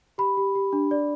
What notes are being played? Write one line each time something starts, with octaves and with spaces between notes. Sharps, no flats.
G4 B5
G4
G4
D4
D5